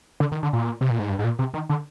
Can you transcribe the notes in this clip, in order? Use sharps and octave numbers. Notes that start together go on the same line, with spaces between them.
D3
D#3
D3
A#2
C3
A#2
G#2
G2
G#2
A#2
C3
D#3
D3